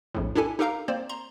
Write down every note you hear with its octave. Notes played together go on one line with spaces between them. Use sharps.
A#1 F2 A2
D4 E4 G4 A4 G#5
D#4 G4 A4 A#4 F5 A#5
A#3 C4 C5 D5
A#5 C6